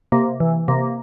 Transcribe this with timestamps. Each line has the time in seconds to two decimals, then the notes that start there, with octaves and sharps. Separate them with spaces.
0.12 C3 A#3
0.40 E3
0.68 C3 A#3